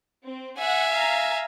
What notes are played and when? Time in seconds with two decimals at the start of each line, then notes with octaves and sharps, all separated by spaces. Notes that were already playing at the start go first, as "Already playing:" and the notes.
0.25 C4
0.58 E5 F#5 G#5
0.91 F5 A#5